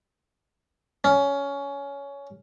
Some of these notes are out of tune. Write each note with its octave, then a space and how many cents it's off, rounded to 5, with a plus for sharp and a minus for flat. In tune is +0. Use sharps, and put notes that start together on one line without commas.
C#4 +20